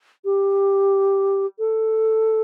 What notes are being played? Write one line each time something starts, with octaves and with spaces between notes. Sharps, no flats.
G4
A4